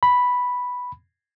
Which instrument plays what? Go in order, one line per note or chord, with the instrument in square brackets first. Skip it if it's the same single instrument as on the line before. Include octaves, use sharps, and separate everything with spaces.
[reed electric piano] B5